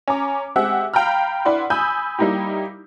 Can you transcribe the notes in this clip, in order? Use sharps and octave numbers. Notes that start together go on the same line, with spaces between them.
C#4 A#5 D6
G#3 C4 G4 E5 F#5
F5 G5 A#5 B5 F6
D4 E4 B4 D5 F#5 C6
G#5 B5 D#6 E6 G6
G3 A#3 D#4 E4 G4